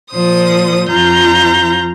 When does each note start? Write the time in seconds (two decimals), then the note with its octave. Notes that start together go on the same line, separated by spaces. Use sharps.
0.11 A#2 F3 C5 D#6
0.89 F2 F3 F4 A#5 G6